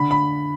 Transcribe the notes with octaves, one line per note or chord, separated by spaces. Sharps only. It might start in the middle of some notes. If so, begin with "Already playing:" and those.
Already playing: D3 B5
B5